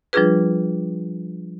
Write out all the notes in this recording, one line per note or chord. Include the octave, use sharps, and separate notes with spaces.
F3 G3 D4 F4 G#4 B4